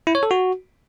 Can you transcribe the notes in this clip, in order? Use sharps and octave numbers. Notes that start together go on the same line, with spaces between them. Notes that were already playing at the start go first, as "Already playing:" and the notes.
E4
C#5
A4
F#4